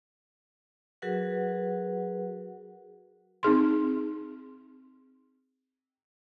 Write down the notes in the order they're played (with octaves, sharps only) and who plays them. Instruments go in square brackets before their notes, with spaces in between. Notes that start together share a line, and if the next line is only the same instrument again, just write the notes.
[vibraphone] F#3 F#4 G#4 A#4 B4 F#5
[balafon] C4 D#4 G#4 C6